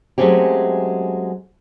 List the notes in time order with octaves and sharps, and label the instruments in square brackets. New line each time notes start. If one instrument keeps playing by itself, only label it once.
[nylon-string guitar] F#3 G#3 A3 C4 C#4 G4